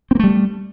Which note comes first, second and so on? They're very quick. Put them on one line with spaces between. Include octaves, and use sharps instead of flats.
C4 A#3 A3 G3